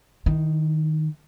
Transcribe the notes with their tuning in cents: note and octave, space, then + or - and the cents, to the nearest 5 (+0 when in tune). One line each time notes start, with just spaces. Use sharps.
D#3 +0 E4 -35